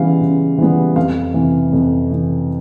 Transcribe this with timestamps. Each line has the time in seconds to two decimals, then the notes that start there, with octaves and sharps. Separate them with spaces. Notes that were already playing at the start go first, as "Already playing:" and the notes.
Already playing: C#3 E3 G3 B3 F5
0.21 C#3
0.58 E3 G3 B3
0.96 F2 F5
1.34 C3 E3
1.73 F2
2.11 C3 E3